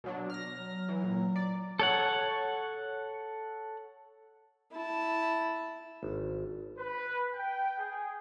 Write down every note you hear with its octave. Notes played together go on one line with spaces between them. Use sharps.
B2 F#3 D4
F6 A#6
F#3
E3
A#2
D5
A4 C#5 F#5
E4 A5
G#1
B4
G5
G#4